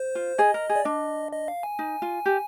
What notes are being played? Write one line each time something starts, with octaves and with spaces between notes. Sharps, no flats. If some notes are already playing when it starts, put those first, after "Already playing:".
Already playing: C5
F4
G#4 D#5
A#4
G#4
D5
D4 D#5
D#5
F5
G#5
D#4
F4
G4